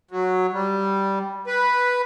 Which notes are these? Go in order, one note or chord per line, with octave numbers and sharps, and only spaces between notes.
F#3
G3
B4